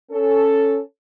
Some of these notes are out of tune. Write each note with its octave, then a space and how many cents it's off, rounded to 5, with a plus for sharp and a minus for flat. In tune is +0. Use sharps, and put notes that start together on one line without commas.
C#4 +0 A4 +0